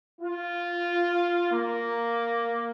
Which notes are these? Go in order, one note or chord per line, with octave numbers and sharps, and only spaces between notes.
F4
A#3